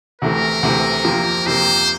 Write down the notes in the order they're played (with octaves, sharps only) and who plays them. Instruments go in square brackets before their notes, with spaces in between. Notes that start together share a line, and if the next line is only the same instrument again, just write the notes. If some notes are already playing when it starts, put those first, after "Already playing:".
[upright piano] D2 C3 E3 A3 [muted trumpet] A#4
[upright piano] D2 C3 E3 A3
F2 C3 F3 A#3
[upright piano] F2 C3 F3 A#3 [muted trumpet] C5